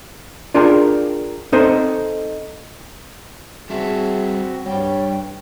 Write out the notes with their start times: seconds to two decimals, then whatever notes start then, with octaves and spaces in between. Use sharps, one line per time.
0.54 D4 F4 G#4 A#4 G5 A#5
1.52 C4 D#4 A4 C5 D#5
3.70 G3 C4 F#4 G#4 E5 A5
4.66 G2 G3 C#5 G5